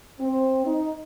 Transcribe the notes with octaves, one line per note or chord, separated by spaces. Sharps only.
C4
D#4